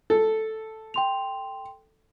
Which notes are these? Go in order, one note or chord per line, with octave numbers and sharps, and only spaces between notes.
A4
G5 C6 F7